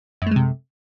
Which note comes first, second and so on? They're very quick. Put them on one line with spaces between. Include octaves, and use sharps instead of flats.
F#2 A3 G#3 C3